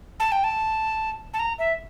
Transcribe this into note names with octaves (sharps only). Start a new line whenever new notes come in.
A5
G5
A5
A5
A#5
E5